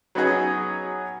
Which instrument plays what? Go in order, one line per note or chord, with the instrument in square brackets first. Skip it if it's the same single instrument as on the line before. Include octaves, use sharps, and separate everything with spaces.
[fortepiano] F#3 B3 C#4 D#4 F#4 G#4